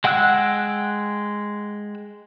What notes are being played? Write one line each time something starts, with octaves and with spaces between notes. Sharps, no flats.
G#3 F#5 G5 E6 F#6